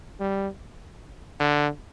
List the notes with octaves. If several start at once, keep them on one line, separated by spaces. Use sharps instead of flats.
G3
D3